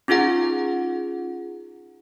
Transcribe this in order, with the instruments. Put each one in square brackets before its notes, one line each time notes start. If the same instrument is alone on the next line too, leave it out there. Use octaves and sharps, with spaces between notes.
[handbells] C#4 D#4 F4 G#4 F#5